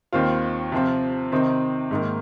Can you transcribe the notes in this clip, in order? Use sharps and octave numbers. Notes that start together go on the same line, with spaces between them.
D#2 D#3 C4 F4
C3 F3 C4 F4
C3 D#3 C4 D#4
G#2 D#3 A#3